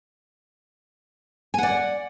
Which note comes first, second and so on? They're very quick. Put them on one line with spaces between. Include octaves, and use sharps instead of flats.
G#5 F#5 D5